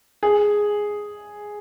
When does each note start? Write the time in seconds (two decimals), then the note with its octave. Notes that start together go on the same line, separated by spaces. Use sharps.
0.23 G#4